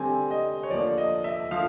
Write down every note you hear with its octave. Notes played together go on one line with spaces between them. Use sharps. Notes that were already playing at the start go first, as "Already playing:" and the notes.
Already playing: D3 G3 C4 G#5
D#5
C#5
D3 F3 A#3 D5
D#5
E5
D3 F3 F5